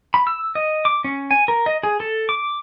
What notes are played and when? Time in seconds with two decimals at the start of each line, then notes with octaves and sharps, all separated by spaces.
0.14 B5
0.27 E6
0.55 D#5
0.85 D6
1.04 C#4
1.31 G#5
1.48 A#4
1.66 D#5
1.83 G#4
2.00 A4
2.29 D6